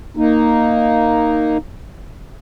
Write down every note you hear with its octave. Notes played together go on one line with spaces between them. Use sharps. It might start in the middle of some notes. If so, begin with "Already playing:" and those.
A#3 D#4